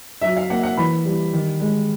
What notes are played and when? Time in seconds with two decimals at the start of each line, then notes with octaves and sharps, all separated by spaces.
0.21 F#3 E5
0.37 F5
0.50 A#3 F#5
0.63 F#5
0.77 E3 B5
1.05 G3
1.33 D#3
1.60 G#3